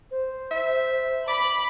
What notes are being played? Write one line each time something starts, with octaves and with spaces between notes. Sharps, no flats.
C5
E5
B5 D6